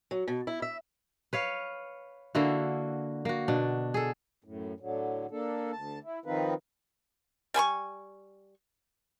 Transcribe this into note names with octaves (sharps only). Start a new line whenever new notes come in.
F#3
B2
E4
E5
B4 C#5 F5
D3 A#3 E4 F#4
A#3 F#4
B2 D4
G#4 A4
F#2 A2
A2 D3 F#3
A#3 D4 A4
D2 A5
E4
D#3 F3 C4 D#4 F4 B4
G3 G#5 B5 C#6